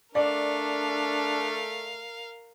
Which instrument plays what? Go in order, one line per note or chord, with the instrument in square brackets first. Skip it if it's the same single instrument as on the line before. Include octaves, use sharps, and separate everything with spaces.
[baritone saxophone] A3 [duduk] D4 [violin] A#4 F5 [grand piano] D5